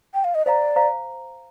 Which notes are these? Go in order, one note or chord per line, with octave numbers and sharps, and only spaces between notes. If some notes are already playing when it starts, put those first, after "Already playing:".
G5
F5
D#5
C5 D5 F5 A#5
C5 F5 A#5